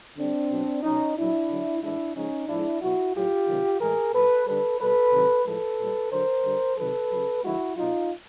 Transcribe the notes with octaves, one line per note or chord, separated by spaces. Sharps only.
D3 G3 C4 D4
B2 F#3
B2 F#3 C#4 D#4
A#2 F#3 D4 E4
D3 F#3
A2 E3 G#3 D4 E4
C#3 F3 G#3 C#4 D#4
A2 F3 G#3 D4 E4
B2 F#3 E4 F#4
A2 F#3 F4 G4
C3 D#3 F#3
A2 E3 G#3 G#4 A#4
A#2 F#3 A4 B4
D3 G3 A4 B4
B2 G3 A4 B4
C3 D#3 F#3
A2 F3 G#3 A4 B4
A#2 G3
D3 F#3 A#4 C5
D3 G3
C3 D#3 F#3 A4 B4
C#3 F#3
D3 F3 G#3 E4 F#4
B2 F#3 D#4 F4